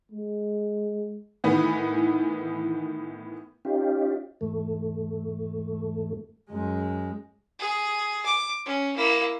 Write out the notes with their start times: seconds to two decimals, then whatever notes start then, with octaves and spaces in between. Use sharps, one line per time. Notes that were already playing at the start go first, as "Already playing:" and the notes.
0.12 G#3
1.44 A2 D#3 E3 B3
3.65 C#4 D#4 F4 G4
4.41 E2 G#2 A3
6.50 F#2 G#3
7.59 G#4
8.26 D6
8.66 C#4
8.97 A#3 E4